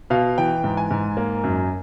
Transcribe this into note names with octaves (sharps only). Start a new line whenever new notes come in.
B2 F5
E3 G5
G#2
G#5
G#2
A#3
F#2